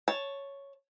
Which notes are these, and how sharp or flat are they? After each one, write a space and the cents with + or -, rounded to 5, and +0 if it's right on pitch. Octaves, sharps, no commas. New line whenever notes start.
C#5 +0 A5 +0